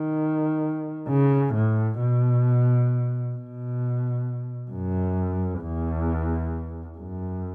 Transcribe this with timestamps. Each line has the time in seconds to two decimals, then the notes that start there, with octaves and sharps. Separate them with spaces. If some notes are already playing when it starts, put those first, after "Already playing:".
Already playing: D#3
1.08 C#3
1.54 A2
2.00 B2
3.35 B2
4.71 F#2
5.62 E2
6.98 F#2